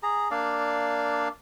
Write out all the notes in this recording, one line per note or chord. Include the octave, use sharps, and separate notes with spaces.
G#4 A#5
A#3 D4 D5 F5